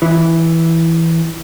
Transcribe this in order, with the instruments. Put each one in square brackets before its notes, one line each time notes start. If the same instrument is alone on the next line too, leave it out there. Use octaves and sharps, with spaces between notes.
[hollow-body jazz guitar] E3